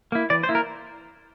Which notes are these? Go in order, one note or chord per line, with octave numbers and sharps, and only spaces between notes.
A#3 E4
E3 D5
C5
A#3 E4
A#4